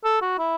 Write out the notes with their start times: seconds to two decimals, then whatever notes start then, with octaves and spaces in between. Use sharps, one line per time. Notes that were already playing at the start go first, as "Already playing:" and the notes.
0.05 A4
0.22 F#4
0.39 E4